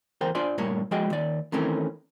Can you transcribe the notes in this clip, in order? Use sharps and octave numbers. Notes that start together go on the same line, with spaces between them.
E2 A#4 C5 G5
D4 F4 C5 D5 G#5 C6
G2 A#2 A3 A#4 C#5
F3 G#3 F#4 G#4 D#5 G5
D#2 D5
D#3 E3 A3 C4 C#4 A#4